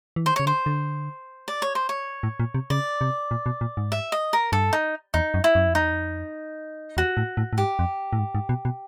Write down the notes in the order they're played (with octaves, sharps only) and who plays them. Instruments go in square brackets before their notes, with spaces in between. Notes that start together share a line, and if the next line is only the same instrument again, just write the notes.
[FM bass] E3
[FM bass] D#3 [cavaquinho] C5
[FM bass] C#3 [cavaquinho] C#5
[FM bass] D3 [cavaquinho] C5
[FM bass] D3
[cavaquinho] D5
C#5
C5
C#5
[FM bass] A2
A#2
C3
[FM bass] C#3 [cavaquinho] D5
[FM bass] C3
A#2
B2
A#2
G#2
[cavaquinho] E5
D#5
A#4
[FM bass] G2 [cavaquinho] A4
[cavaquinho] D#4
[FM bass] E2 [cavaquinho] D#4
[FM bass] F#2
[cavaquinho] E4
[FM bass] F#2
F2
[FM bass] E2 [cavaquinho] D#4
[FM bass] F2
[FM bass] E2 [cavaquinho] F#4
[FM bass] A2
A2
A2
[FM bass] G#2 [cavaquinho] G4
[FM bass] F2
A2
G#2
G#2
B2
B2